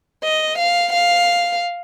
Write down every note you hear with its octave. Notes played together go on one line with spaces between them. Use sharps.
D#5
F5
F5